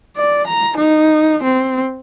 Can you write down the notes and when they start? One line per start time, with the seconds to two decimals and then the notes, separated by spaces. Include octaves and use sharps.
0.16 D5
0.47 A#5
0.77 D#4
1.43 C4